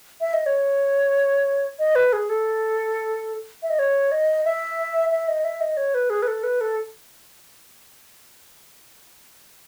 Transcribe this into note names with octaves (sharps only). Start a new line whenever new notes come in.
E5
D#5
C#5
D#5
B4
G#4
A4
E5
D#5
C#5
D#5
E5
E5
D#5
E5
D#5
C#5
B4
G#4
B4
A4
B4
A4